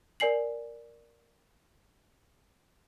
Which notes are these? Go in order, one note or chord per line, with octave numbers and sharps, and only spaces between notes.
A#4 D5 G#5 C7 F#7